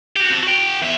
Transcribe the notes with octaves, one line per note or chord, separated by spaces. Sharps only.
F#4 G4
C4 A5
F#4 G5
E2 E5